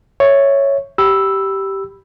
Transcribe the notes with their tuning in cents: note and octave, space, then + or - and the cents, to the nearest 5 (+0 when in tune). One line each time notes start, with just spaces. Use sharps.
C#5 +0 E5 +0
G4 -10 B5 +0 E6 +0